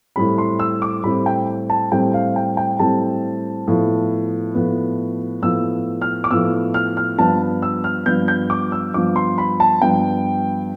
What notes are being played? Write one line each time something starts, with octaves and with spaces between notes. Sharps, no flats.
A2 G3 C4 B5
C6
E6
D6
A2 G3 C4 B5
G5
A5
A2 G3 C4 G5
F5
G5
G5
A2 G3 C4 A5
A2 F3 B3
A2 F3 B3
A2 F3 B3 E6
F6
D6
A2 F3 B3 E6
F6
F6
G2 F3 B3 A5
E6
F6
G2 F3 B3 G6
G6
D6
E6
G2 F3 B3 D6
C6
B5
A5
G2 F3 B3 G5